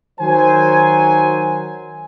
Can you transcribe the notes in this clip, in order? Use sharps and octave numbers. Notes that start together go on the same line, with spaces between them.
D#3 F#3 C5 G#5